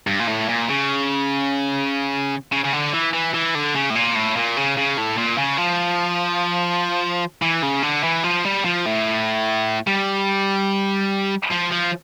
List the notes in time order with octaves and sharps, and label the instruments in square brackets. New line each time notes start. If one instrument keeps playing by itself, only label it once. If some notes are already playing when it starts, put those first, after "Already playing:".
[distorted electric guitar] G2
A#2
A2
A#2
C#3
C#3
C#3
D3
E3
E3
E3
D3
C#3
A2
A#2
A2
A#2
C#3
C#3
A2
A#2
C#3
F3
E3
C#3
D3
E3
F3
G3
F3
A2
G3
F3
F3